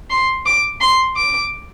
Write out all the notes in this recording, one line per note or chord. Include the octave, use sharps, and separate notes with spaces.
C6
D6
C6
D6